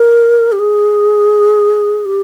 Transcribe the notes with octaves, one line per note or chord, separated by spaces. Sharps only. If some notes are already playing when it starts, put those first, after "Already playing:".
Already playing: A#4
G4
G#4
G4